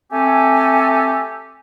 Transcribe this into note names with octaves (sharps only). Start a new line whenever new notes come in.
A3 C4 G4 A4 G#5